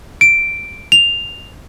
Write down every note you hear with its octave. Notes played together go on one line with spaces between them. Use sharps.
D7
F7